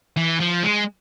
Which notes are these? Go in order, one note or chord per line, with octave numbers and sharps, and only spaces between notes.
E3
F3
G#3